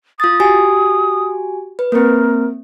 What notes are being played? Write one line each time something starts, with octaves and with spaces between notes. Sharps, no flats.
F4 D#6 A6
F#4 G4 G#5
B4
A#3 C4 A#4